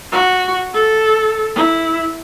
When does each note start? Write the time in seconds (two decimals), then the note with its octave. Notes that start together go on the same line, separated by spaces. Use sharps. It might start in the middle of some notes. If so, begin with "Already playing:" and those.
0.12 F#4
0.74 A4
1.56 E4